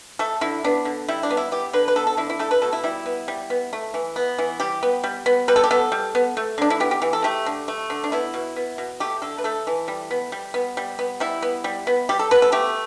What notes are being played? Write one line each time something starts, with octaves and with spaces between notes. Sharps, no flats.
A3 A4
D3 E4
B3 D4
D3
G3 E4
D4
B3
E4
B3 G4
D3 B4
B4
B3 A4
A4
D3 E4
E4
A3 A4
B4
B2 A4
E4
G3 E4
B3
G3
B3
A3
E3
B3
E3
G3 G4
B3
G3
B3
G3 B4
A4
G4
B3 A4
G3
B3
A3
D3 D4
E4
B3 G4
G4
E3
A4
A3 G4
D3
A3
D3
D4
B3 E4
B2
B3
B2
A3 G4
D3 A4
B4
A3 A4
E3
G3
B3
G3
B3
G3
B3
G3 E4
B3
G3
B3
G3 G4
A4
B3 B4
A4
A3 G4